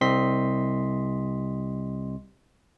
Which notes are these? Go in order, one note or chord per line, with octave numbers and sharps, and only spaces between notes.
C2 C4 D#5 C6 B6